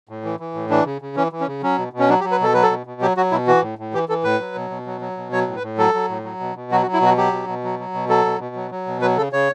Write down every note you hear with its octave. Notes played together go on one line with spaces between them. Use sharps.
A2
E3
E3
A2
E3 D4
C#3
C#3
E3 C#4
E3
C#4
C#3
F#3 C#4
B2
B2
C#4
F#3 D4
G4
F#3
B4
B2 A4
F#3 B4
A4
B2
B2
F#3 G4
F#3 F#4
B2 E4
E3 F#4
A2
A2
E3 G4
E3 A4
A2 B4
F#3
B2
B2
F#3
F#3
B2
F#3 C#5
A2
B4
A2
F#3 A4
F#3
A2
F#3
B2
B2
F#3 F#4
F#4
F#3
E4
B2 F#4
F#3 G4
B2
B2
F#3
F#3
B2
F#3 A4
B2
B2
F#3
F#3
B2
F#3 B4
C#3 A4
C#3 C#5